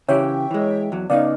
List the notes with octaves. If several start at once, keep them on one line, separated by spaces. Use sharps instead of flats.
C#3 E3 G4 C#5 E5 G5
E3 G#3
E2 F#3
C#3 B3 D#4 D5 F5